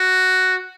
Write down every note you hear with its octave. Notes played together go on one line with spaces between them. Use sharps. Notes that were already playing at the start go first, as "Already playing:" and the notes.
Already playing: F#4